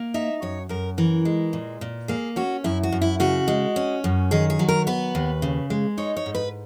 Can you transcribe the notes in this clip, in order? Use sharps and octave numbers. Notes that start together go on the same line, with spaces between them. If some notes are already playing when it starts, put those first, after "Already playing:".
Already playing: A#3
D#4 E5
F#2 C#5
F#2 A#4
E3 A#4
G#3
A#2
A#2
A#3 G#4
C#4 F#4
F#2 E4
F#4
F#2
E4
C#3 F#4
G#3
C#4
F#2
D#3 G#4
G#4
F#3
A#4
B3 B4
D#2
C#3
G#3
D#4 C#5
C#5
G#2
B4